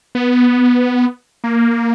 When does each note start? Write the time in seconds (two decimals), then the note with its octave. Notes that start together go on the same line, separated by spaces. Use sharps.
0.15 B3
1.44 A#3